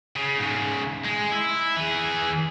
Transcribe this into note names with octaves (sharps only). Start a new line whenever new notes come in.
C#3
G#2 C#3
G#3
E4
E3 G#4